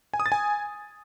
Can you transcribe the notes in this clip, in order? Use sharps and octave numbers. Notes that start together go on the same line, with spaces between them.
G#5
D#6
A6
G#5